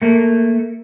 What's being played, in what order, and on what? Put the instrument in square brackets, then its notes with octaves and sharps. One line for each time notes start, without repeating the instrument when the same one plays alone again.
[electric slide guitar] A3 A#3